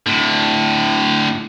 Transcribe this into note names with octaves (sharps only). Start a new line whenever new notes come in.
A2 D3